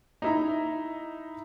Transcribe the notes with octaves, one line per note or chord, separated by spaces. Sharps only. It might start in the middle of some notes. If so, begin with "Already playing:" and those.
D#4 E4 A#5